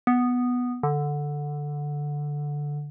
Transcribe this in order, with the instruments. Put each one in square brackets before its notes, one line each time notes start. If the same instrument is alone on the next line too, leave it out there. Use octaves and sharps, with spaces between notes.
[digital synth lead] B3
D3